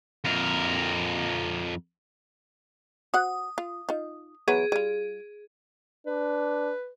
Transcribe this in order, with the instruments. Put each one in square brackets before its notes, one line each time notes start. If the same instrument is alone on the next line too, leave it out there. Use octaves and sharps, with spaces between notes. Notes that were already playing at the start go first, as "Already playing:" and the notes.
[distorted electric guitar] F2 A#4
[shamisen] F#4 C5 F#5 [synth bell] D#6
[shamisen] F4
D#4 F4
[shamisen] E3 F#3 B3 [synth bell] G#4
[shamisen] G3 F4 [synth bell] G#4
[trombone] D4 [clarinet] B4